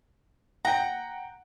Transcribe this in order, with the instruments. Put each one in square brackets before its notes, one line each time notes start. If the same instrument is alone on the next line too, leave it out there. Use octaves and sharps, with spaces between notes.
[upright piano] F#5 G5 [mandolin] A#5